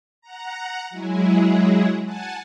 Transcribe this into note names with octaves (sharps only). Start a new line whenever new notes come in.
F#5 A#5
F#3 G#3 E4 G#4
F#5 G#5 A5